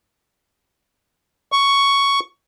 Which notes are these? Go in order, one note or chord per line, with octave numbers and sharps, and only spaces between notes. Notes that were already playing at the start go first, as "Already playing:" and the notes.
C#6